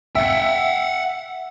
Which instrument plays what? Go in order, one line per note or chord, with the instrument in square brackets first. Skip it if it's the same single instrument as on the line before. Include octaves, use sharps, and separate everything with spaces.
[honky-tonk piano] E5 C#7 [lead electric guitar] F#5 G5